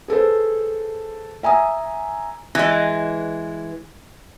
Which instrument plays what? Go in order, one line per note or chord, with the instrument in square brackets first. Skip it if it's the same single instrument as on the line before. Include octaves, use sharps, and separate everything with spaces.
[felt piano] G#4 A4 B4 C5
E5 G#5 A#5 D#6
[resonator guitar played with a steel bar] E3 G#3